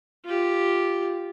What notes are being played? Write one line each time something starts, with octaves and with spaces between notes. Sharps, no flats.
F4 G4